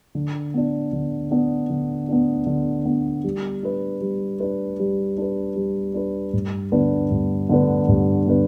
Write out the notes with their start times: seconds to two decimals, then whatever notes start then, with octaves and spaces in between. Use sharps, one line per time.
0.15 D3
0.54 B3 D4
0.93 D3
1.31 B3 D4
1.70 D3
2.09 B3 D4
2.47 D3
2.85 B3 D4
3.24 G3
3.63 D4 B4
4.01 G3
4.40 D4 B4
4.80 G3
5.18 D4 B4
5.56 G3
5.94 D4 B4
6.33 G2
6.72 D3 B3 D4 B4
7.11 G2
7.49 D3 B3 D4 B4
7.88 G2
8.27 D3 B3 D4 B4